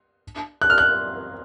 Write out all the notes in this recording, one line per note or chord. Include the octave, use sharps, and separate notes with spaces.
F#6
F6
F#6